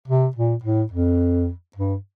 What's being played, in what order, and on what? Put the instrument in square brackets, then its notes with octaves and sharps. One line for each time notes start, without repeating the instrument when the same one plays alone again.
[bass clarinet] C3
A#2
A2
F2
G2